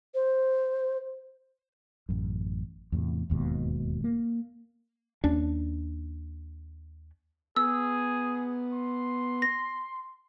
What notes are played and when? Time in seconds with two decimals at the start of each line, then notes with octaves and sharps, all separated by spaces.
0.14 C5
2.09 A1 F#2
2.92 E2 A2 C3
3.30 E1 D#2 G#2 B2
4.04 A#3
5.24 D#2 C#4 D4
7.56 B3 G#4 E6
8.73 C6
9.42 A#6